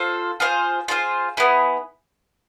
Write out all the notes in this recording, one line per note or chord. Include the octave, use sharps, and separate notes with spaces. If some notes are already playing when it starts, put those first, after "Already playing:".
Already playing: F4 A4 C5
F4 G#4 C5 F5
F4 G#4 C5 F5
B3 E4 G#4